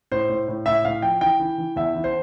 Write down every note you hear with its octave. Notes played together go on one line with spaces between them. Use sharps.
A2 C5
A2
A2
A2 E5
A2 F5
F3 G5
E3 G5
E3
E3
E2 E5
E3
C5